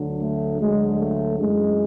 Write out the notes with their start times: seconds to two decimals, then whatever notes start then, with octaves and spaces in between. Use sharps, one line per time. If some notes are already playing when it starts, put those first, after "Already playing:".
Already playing: D2 D3 F#3
0.21 A3
0.61 D2 D3 F#3 G#3
1.00 A3
1.39 F#2 E3 G#3